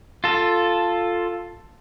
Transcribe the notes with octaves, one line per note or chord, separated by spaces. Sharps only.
F4 A4